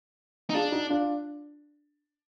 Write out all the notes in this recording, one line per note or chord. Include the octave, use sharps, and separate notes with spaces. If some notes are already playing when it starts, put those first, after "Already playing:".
D#4
D4 F4 G#4
D#4 F#4
D4 F4